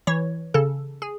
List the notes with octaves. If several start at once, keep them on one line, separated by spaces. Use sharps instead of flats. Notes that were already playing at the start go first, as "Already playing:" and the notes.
E3 C#5
C#3 A4
G#4